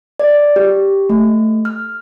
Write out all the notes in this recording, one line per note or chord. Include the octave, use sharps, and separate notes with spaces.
D5
G4
A3
F6